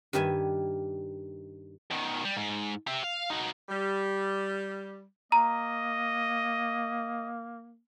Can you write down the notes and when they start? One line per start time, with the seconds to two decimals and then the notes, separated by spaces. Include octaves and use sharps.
0.13 G2 D#3 G4 E5 G#5
1.91 B2 D#3
2.25 G3
2.37 G#2
2.87 G4 E5
3.04 F5
3.30 D#4 F#4
3.68 G3
5.32 A#3 D#5 A#5